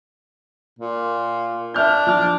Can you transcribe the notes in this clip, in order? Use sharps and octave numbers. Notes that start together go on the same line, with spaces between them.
A#2
D4 E5 F6 G6
F3 A5 F6